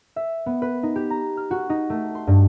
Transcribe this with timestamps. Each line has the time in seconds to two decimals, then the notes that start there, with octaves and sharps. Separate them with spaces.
0.16 E5
0.46 B3
0.62 B4
0.83 D#4
0.96 G4
1.10 A#5
1.37 F6
1.51 F#4
1.70 D#4
1.90 A3
2.15 C6
2.27 G2